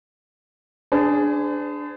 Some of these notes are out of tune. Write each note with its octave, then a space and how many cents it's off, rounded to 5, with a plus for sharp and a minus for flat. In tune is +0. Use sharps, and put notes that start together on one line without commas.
D4 +0 G#4 +0 C5 -45